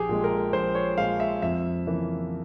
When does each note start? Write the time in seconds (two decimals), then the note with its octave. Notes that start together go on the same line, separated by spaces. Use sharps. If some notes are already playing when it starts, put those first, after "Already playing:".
Already playing: A#1 G4 G#4
0.09 A#2 G#3
0.24 A#4
0.53 A#1 C5
0.75 C#5
0.98 A#2 G#3 F5
1.20 E5
1.42 F2 E5
1.86 C#3 E3 A#3